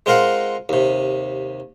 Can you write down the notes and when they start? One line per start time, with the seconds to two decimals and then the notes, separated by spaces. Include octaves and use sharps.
0.06 G#3 C4 F4 A#4 F5 F#5
0.69 D#2 C3